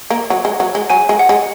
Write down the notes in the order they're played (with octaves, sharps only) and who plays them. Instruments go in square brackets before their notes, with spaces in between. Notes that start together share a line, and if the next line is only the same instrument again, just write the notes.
[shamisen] A#3
F#3
G#3
F#3
G#3
[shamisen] F#3 [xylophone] G#5
[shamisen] G#3
[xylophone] F#5
[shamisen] G#3